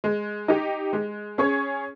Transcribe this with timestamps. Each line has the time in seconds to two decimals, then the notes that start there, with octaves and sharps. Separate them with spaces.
0.04 G#3
0.48 D#4 G4
0.93 G#3
1.38 C#4 G#4 C#5